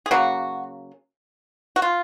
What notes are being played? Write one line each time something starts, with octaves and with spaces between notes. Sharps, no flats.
G#4
C#3 F#3 A#3 F#4
F#4
F4